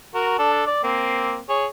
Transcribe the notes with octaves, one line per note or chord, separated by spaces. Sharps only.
F#4 A#4
D4 A4
D5
A#3 C4
G#4 C#5